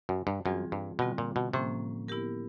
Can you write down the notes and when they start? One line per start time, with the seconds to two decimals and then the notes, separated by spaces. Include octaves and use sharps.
0.09 F#2
0.27 G2
0.45 F#2 E3 G3 C4 F4 G#4
0.72 G2
0.99 B2 D3 G3 C4 F4
1.18 A#2
1.36 B2
1.53 A2 C3 F3 A#3 C#4
2.08 B3 E4 G4 A#4